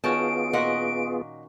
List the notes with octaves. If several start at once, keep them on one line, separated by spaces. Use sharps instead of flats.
D#3 B3 C#4 F4 F#4 G#4 A5 D7
A#2 A#3 F#4 D#5 F#5